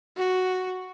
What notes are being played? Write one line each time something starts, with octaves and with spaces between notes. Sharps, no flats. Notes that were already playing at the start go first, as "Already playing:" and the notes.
F#4